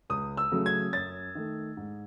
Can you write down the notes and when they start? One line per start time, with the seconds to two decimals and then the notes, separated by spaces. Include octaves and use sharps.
0.10 C#2 D#6
0.37 E6
0.52 C#3 F#3 A3
0.66 G#6
0.93 F#2 A6
1.35 D#3 A3
1.77 G#2